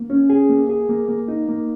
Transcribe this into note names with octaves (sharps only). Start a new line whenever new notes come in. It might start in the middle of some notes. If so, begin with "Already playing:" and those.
Already playing: A#3
C#4
G#4
A#3
G#4
A#3
A#3
D#4
A#3